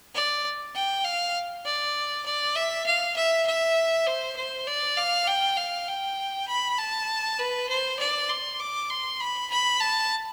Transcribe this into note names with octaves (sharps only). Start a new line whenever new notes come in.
D5
G5
F5
D5
D5
E5
F5
E5
E5
C5
C5
D5
F5
G5
F5
G5
B5
A5
B4
C5
D5
C6
D6
C6
B5
B5
A5